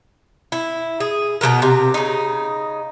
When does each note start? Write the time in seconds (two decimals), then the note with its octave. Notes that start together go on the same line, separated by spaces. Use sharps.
0.52 E4
1.00 G#4
1.41 B2 F#3 B3 A#4
1.62 C3
1.94 C#3 D#4